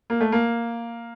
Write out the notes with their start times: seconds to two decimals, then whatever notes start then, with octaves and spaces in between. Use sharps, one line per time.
0.10 A#3
0.21 A3
0.32 A#3